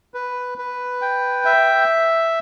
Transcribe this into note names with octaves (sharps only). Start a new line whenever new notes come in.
B4
B4
G5
E5